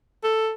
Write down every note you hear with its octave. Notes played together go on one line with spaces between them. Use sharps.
A4